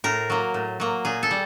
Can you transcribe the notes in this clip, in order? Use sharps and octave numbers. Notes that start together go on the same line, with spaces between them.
A2 A#4
F#3 A#3
A2
F#3 A#3
A#2 G#4
A4
G3